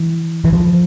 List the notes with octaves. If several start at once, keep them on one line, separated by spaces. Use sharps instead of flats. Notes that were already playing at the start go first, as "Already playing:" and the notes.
Already playing: E3
E3
F3